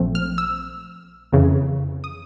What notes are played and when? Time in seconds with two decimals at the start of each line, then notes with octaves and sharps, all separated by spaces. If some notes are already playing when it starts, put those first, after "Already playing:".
Already playing: A#1 A#2 F3 A3 C4
0.15 F6
0.38 E6
1.32 F2 C#3 E3
2.04 D#6